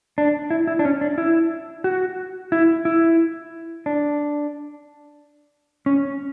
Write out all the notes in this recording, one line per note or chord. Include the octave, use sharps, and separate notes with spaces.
D4
E4
E4
D4
C#4
D4
E4
F#4
E4
E4
D4
C#4